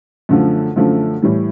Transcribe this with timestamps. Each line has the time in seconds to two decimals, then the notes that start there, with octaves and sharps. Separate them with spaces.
0.29 F#2 D3 F3 A3
0.76 F#2 D3 F3 A3
1.22 A2 E3 G3